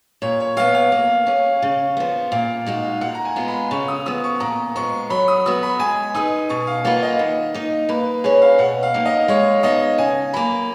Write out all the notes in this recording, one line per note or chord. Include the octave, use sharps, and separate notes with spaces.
A#2 C#5
C#5
F#3 B3 F5
F5
A#3
C#4 G#4
C#3
F3 B3
A#2 F5
G#3 D#4 F#4
A#2 F#5
A#5
G#5
G#3 B3 F4
B5
C#3 C#6
D#6
F3 B3 D#6
C#6
A#2 A#5
F3 G#3 B3 C#6
F#3 B5
D#6
B3 F#4 B4 D#6
B5
G#3 G#5
D#4 G#4 B4 D#6
B2 C#6
F5
A#3 F4 B4 F#5
D#5
D#3
A#3 D#4
A#3 B4
C#4 G#4 B4 C#5
F5
B2 F#5
F5
F#3 A#3 D#4
D#5
G#3 C#5
B3 D#4 D#5
C#3 G#5
F#3 A#3 B5